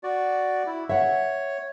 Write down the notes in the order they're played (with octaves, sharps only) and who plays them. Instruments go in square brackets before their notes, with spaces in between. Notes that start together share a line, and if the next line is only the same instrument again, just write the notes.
[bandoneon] F#4 D5
E4
[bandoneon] C#5 [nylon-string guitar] E5 F#5